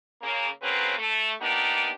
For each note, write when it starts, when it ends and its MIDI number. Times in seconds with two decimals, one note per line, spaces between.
0.22 0.47 49
0.22 0.47 58
0.62 0.94 49
0.62 0.94 54
0.62 0.94 58
0.62 0.94 60
0.62 0.94 71
0.97 1.32 57
1.41 1.90 58
1.41 1.90 59
1.41 1.90 62
1.41 1.90 63
1.41 1.90 67